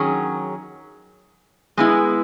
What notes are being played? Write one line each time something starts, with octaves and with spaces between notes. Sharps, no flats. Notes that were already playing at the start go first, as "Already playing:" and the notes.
Already playing: D#3 F#3 C#4 G#4
G#3 B3 E4